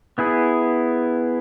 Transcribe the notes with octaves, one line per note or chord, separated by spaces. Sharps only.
B3 E4 G#4